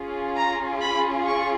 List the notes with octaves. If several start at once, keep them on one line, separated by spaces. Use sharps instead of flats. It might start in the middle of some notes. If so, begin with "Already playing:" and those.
Already playing: C#4 F4 G#4
A#5
B5
C#6